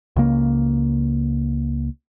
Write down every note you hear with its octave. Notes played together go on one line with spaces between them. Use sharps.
C#2 C#3 A#3